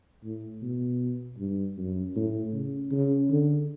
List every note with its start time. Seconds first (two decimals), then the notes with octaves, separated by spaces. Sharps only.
0.24 A2
0.62 B2
1.38 G2
1.78 F#2
2.16 A2
2.53 C#3
2.91 C#3
3.30 D3